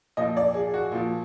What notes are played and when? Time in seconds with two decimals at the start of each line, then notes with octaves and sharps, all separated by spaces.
0.17 A#2 F3 D#5
0.37 D5
0.54 G#4
0.74 F#4
0.92 A#2 F3